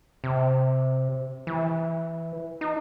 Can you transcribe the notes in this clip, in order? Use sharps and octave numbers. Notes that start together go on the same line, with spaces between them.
C3
E3
D#4